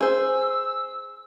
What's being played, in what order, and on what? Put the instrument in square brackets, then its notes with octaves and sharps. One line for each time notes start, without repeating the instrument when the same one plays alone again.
[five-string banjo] G#4 C5 [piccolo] E6